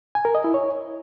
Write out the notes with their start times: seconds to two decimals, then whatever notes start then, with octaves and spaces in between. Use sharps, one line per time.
0.15 G#5
0.25 A#4
0.35 D#5
0.44 E4
0.54 C#5